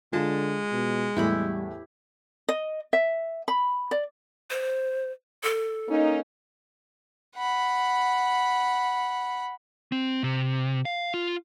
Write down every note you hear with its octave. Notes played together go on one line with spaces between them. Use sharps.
D3 G#3 F4 A5
B2
E2 A2 G3 E4 G4 B5
D#5
E5
B5
D5
C5
A4
A#3 C#4 D#4
F#5 B5
C4
C3
F5
F4